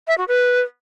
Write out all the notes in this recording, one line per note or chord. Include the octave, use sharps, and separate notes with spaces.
E5
F#4
B4